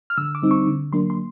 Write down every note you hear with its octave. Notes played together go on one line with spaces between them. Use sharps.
F6
D3 E6
D6
G3 C4 D#4
C#6
D3
F#3 A#3 D4 C6
C6